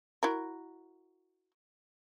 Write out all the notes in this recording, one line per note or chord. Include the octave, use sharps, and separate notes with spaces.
E4 F#4 A#4